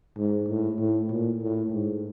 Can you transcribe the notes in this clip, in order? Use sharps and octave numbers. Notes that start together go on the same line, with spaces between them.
G#2
A2
A2
A#2
A2
G#2